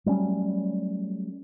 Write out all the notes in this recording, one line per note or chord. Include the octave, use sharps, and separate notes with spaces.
F#3 G3 A3 C#4